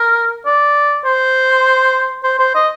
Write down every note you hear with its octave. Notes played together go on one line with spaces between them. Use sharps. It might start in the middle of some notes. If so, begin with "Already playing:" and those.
Already playing: A#4
D5
C5
C5
C5
D#5